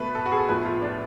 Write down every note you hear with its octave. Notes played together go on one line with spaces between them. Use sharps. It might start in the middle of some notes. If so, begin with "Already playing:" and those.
Already playing: B2 A3 B4
A4
F#4
G#4
A4
A2 F3 B3 B4
F4
D4